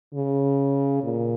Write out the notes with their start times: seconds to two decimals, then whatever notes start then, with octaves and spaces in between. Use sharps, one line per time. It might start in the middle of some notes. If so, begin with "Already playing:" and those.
0.14 C#3
1.03 A#2